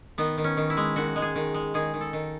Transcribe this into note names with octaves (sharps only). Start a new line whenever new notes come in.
D#3 B3
D#3
C#4
D#3
E4
G#3
D#3 F#4
G#3
G#4
D#3
G#3
D#3 G#4
D#3
A4
D#3